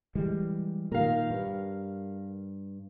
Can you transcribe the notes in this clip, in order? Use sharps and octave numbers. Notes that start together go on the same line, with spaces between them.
E3 G3 G#3
A#2 D#3 A#4 F5
G2